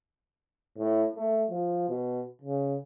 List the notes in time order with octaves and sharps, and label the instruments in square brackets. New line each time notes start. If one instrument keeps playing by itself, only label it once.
[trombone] A2
A3
F3
B2
C#3